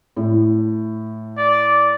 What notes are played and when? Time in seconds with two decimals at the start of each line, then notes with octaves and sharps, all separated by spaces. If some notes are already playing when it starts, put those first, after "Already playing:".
0.17 A2
1.37 D5